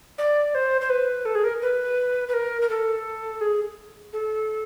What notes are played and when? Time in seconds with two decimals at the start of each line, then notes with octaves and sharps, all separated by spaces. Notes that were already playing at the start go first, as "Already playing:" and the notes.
0.18 D5
0.55 C5
0.81 C5
0.90 B4
1.25 A4
1.35 G#4
1.44 A#4
1.62 B4
2.28 B4
2.33 A#4
2.62 A#4
2.69 A4
3.41 G#4
4.13 A4